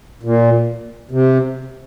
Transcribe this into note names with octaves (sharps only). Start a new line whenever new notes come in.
A#2
C3